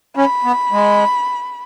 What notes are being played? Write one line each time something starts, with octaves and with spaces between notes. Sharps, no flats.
C#4 B5
B3
G#3